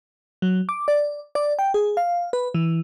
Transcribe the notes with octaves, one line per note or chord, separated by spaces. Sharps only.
F#3
D6
D5
D5
G5
G#4
F5
B4
E3